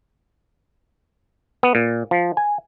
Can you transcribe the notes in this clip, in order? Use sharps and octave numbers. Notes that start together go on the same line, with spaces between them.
B3
A#2
F3
G#5